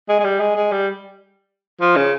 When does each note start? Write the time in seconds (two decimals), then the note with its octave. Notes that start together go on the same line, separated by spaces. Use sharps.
0.09 G#3
0.20 G#3
0.25 G3
0.40 G#3
0.56 G#3
0.72 G3
1.81 F3
1.96 C#3